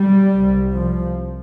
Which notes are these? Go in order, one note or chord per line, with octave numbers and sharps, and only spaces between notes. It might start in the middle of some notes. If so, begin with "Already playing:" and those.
Already playing: G3
C2 C3
F3